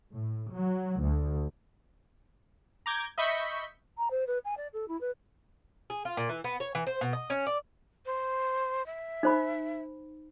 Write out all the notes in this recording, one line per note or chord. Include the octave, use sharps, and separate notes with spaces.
A2
F#3
D2
A#5 D6 G6 G#6
D#5 E5 B5 C#6 G6 B6
A#5
C5
B4
G#5
D5
A4
E4
B4
G#4
F4
A#2
E3
B3
C#5
E3
C5
B2
D#5
C#4
D5
C5
E5
D#4 C5 B5